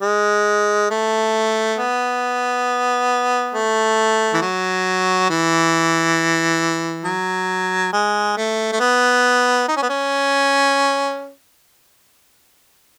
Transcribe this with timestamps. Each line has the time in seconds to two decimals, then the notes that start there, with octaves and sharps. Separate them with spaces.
0.02 G#3
0.91 A3
1.78 B3
3.54 A3
4.34 E3
4.42 F#3
5.30 E3
7.05 F#3
7.93 G#3
8.37 A3
8.72 A3
8.80 B3
9.68 D#4
9.76 C#4
9.83 B3
9.89 C#4